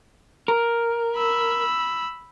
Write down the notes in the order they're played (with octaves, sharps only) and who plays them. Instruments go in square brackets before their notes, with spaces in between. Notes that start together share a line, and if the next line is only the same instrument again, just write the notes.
[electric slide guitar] A#4
[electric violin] B5 E6